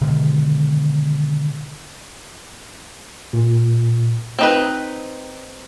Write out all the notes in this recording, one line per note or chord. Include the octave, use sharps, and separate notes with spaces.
B2 D3 D#3 G#3
A#2
C4 D#4 B4